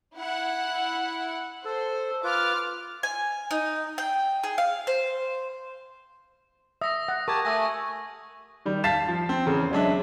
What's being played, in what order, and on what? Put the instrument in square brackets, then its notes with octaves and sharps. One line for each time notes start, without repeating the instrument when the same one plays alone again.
[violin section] E4 F#5
[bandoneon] A4 [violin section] C5
[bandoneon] F4 B4 [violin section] D6 F6
[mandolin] G#5
D#4
G5
G#4
F5
C5
[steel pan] E5 [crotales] D#6 A#6
[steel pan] F#5
[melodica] G4 A5 [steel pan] A#4 [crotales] C#6 G#6
[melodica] A3 G#5 [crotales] E6 A#6
[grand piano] D#3 G3
F5 A5 A6 B6 C7 E7
F3
C4
E2 C#3
F#3 G#3 D4 E5